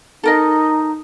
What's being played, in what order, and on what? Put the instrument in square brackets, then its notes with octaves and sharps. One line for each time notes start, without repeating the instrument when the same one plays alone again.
[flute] D#4 [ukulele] A4 A#4 D#5